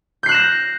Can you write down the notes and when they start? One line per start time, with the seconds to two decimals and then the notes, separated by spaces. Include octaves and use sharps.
0.23 G6
0.26 C7
0.29 F#6
0.32 E7
0.34 A#6